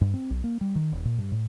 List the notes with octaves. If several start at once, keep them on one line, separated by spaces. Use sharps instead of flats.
G2
C4
B1
A#3
G3
D#3
D#1
A#2
G2
A2